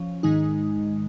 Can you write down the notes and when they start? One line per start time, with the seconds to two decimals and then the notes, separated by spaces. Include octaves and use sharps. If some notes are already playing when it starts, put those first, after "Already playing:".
Already playing: F3 C#4
0.23 G#2 D#3 G#3 D#4